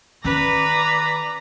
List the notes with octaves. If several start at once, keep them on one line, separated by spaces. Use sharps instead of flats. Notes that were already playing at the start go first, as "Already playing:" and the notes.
D#3 C#4 B4 D5 A#5